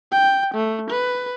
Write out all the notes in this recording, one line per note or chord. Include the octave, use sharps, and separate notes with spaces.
G5
A3
B4